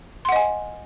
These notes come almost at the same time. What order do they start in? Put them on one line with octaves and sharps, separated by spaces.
C6 F#5 D#5 G#5